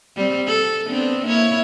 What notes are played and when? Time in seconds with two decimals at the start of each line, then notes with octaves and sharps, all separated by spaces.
0.16 G3 C4
0.48 A4
0.89 B3 C4 D4
1.25 A#3 E4 C#5